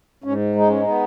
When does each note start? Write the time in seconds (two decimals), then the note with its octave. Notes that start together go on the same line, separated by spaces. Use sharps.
0.24 G#2 C#4
0.55 G#3 D#4
0.68 C#4
0.82 D#4
0.87 B3